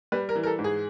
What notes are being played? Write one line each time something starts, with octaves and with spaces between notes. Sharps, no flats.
G3 B4
A#4
E3
A#4
A4
G#2
G#4